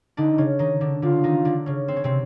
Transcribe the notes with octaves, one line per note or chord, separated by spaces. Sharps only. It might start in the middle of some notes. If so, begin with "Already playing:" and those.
D3 D4 D#4
C#3 C#4
D#3 D#4
D3 D4
D3 D4 F4
D#3 D#4
D3 D4
C#3 C#4
C4
C#4
C3 C4